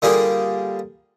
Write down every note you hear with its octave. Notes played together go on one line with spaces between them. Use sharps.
D3 G3 A#3 F4 G#4 D5